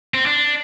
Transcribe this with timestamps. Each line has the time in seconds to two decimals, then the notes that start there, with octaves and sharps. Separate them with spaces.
0.14 C4
0.26 D4